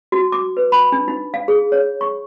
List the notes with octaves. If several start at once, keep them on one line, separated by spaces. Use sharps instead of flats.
F#4
D6
B4
B5
D4
D#4
F5
G#4
C#5
C#6